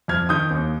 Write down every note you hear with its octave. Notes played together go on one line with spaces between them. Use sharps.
F2 F6 G#6
D#3 D#6 G6
D#2